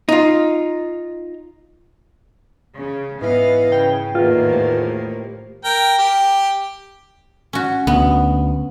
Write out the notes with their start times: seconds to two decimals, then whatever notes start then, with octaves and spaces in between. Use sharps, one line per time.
0.09 D#4 F4
2.77 C#3
3.22 G#2 E3 B3 D#5 F5
3.72 C#3 G5
4.15 E2 A2 D#3 A#3 F4
4.52 A3 G4 C5
5.65 A#4 G5
5.99 G4
7.53 C#4 F#4
7.87 D2 B3